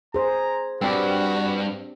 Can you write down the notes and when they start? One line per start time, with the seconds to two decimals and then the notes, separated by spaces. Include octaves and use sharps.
0.14 G#4 C5 A#5
0.81 G2 C4 D4 F#4 G4